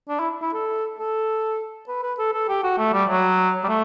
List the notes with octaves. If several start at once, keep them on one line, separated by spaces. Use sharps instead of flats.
D4
E4
E4
A4
A4
B4
B4
A4
A4
G4
F#4
A3
G3
F#3
G3
A3